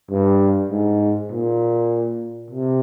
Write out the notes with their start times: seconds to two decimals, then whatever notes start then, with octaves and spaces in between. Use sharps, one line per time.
0.11 G2
0.71 G#2
1.31 A#2
2.50 C3